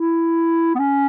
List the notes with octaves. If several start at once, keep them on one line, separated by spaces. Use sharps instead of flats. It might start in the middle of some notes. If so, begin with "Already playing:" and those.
Already playing: E4
B3
C#4